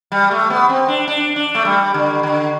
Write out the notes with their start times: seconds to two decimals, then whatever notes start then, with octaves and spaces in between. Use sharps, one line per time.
0.12 G3
0.31 A3
0.50 B3
0.69 C4
0.88 D4
1.08 D4
1.36 D4
1.55 A3
1.65 G3
1.94 D3
2.23 D3